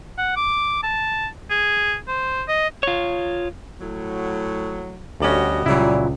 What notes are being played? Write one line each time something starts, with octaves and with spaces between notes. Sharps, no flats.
F#5
D6
A5
G#4
C5
D#5
F4 C#5
A2 F#3
D2 G3 C#4 F#4 D#5
C#2 A#2 F#3 G3 E4